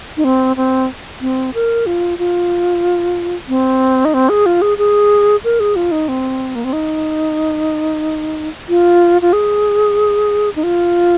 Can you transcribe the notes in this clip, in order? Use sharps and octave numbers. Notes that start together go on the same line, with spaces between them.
D#4
C4
C4
C4
A#4
F4
F4
C4
D#4
C4
G#4
F4
G#4
G#4
A#4
G#4
F4
D#4
C4
A#3
C4
D#4
F4
F4
G#4
D#4
F4